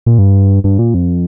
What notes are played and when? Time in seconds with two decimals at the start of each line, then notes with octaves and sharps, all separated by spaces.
0.06 A#2
0.18 G2
0.64 G2
0.79 A#2
0.94 F2